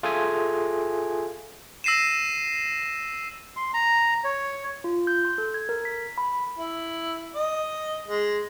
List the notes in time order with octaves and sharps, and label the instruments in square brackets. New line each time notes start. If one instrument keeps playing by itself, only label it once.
[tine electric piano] F4 G#4 A4 E5 G#5
[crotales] E6 A#6 C7 D#7 E7
[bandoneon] C6
A#5
C#5
[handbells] F4
G6
C6
A4
G#6
A#4
B6
B5
[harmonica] E4
D#5
G#3